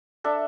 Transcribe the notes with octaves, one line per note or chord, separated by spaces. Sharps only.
D4 A4 E5